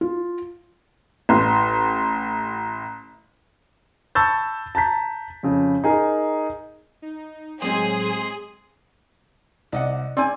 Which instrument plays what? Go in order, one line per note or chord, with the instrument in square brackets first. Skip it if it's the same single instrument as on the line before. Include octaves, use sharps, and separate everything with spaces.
[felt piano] F4
[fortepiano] A1 C6
[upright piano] A5 B5 C#6 E6 G6 A6
A5 A#5 G6 B6
F2 C#3
D#4 G#4 A#4
[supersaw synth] D#4
[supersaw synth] A2 F#3 [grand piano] G#3 C4 C5 [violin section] G#4 [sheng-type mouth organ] C6 D#6
[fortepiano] C2 [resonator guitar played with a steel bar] D5 D#5 F#5
[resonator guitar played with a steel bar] C4 [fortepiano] D5 G#5